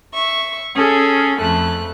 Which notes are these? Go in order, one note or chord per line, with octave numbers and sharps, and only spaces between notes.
E5 C#6
C#4 G#4 A4
F2 A3 F#6